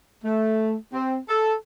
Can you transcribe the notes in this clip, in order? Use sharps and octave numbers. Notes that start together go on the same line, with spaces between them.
A3
C4
A4